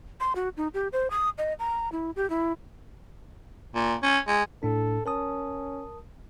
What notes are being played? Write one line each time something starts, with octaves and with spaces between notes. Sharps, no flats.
C6
F#4
D#4
G4
C5
D#6
D#5
A#5
E4
G4
E4
A#2
C#4
G#3
A2 D4 A4
C#4 A#4 A5 D#6